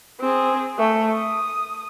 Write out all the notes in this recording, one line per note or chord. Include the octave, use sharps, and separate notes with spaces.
C4 G#4
A3
D#6